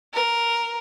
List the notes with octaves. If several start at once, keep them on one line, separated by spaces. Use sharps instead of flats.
A#4